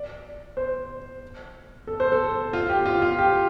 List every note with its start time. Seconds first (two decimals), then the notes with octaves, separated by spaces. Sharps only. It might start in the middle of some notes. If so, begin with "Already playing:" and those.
Already playing: D5
0.57 C5
1.87 A4
2.00 C5
2.12 A4
2.53 F4
2.69 G4
2.86 F4
3.02 F4
3.19 G4